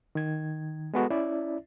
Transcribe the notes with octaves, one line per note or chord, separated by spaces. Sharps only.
D#3 G#6
G#3 B3 F#4 A4
C#4 E4 D5 E5